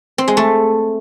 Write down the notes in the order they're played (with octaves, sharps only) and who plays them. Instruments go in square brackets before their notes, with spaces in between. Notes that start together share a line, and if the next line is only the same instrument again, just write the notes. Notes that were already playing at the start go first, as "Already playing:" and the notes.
[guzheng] C4
G#3
A3